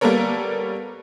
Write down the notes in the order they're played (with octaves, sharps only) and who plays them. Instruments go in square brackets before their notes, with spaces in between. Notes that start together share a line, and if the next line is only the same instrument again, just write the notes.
[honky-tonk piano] G3 A#3 B3 A4 A#4 C#5